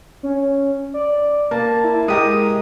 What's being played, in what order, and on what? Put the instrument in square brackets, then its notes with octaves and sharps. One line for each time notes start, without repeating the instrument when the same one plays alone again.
[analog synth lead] C#4
D5
[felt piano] A#3 [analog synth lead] A5
[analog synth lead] E4
[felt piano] G#3 G4 A#4 [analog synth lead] D#6